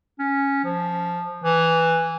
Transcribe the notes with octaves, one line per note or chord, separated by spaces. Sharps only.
C#4
F3
E3